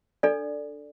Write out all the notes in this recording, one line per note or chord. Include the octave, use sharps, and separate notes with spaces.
D4 A4 D5